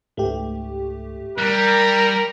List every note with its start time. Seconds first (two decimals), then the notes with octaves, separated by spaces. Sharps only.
0.17 C#2 G#2 A3 G4
1.38 G3 A#4 F#6